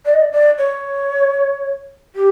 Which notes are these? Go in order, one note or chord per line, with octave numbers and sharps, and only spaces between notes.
D5
D#5
D5
D5
C#5
G4